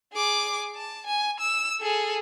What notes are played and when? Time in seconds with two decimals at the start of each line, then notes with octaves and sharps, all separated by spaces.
0.13 G#4 D6
0.76 A5
1.07 G#5
1.40 E6
1.81 G#4 A4